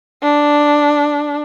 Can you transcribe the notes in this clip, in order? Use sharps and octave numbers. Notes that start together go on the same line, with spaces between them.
D4